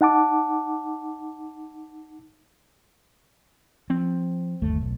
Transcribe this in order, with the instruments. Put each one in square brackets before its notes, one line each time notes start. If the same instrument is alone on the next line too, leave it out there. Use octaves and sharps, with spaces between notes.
[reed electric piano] D#4 F#5 A5 D6
[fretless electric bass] F3 [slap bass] C4
[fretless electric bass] G1 D#2 A3
B1